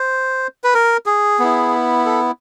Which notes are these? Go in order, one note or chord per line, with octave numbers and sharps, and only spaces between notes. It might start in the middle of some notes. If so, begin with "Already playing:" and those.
Already playing: C5
B4
A#4
G#4
B3 E4
A4